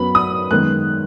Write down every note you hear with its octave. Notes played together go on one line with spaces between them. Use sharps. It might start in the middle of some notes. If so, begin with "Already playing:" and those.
Already playing: F#2 F#3 B3 B5
D#6
F#2 D#3 G#3 B3 F#6